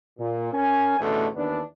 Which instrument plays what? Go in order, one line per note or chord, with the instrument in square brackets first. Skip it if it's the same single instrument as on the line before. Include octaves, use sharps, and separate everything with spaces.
[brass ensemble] A#2
C#4 A#4 G#5
A1 E2 B2 D3 A3
D#2 E3 B3 D4